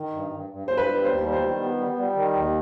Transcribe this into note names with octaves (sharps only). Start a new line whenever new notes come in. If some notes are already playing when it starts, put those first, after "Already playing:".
Already playing: D#3
G2
G2
G2
G2 C5
B4
G3
D#2 C5
G3
C5
D#3
B3
G3
G3
D#3
D#2